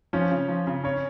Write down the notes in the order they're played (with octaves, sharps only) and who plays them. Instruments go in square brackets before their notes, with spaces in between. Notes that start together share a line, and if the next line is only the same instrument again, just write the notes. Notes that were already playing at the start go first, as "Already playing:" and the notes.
[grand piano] F3 [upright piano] C#4 C#5
[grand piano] C#3
F3
C#3
[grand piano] C#3 [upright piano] C#4 C#5